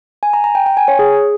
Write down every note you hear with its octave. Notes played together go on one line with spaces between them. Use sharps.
G#5
A#5
A#5
G5
G5
G#5
C#5
G#4